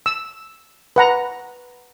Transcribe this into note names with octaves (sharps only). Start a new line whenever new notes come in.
E6
B4 F#5 A#5